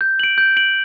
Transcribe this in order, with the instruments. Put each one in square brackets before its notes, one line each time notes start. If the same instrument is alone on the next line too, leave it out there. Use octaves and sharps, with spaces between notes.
[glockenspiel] G6
D7 F#7
G6
D7 F#7